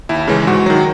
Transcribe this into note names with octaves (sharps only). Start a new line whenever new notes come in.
D#2 E4
C#3 E3 G#3 C#4
G#2 F#4
D#3 F#3